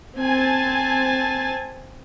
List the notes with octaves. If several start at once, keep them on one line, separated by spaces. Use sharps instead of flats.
C4 G#5 A5